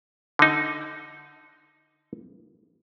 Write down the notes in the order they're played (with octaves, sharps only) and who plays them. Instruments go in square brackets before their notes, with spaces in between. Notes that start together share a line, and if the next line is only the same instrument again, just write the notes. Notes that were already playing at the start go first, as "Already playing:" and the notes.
[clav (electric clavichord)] D3 D#4